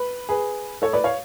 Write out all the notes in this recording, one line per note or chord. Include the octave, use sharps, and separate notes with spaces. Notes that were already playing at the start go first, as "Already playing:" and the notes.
Already playing: B4
G#4 B4
A4 C#5
B4 D5
C#5 F5